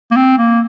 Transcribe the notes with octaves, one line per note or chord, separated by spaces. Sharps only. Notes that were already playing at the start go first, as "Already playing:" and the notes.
A#3
C4
A#3